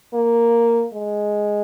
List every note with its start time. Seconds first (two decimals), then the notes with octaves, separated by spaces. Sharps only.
0.14 A#3
0.93 G#3